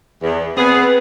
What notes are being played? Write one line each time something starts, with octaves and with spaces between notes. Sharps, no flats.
E2
B3 C4 G#4 B4